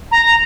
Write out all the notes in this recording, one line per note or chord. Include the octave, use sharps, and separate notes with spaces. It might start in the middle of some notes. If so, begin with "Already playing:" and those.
A#5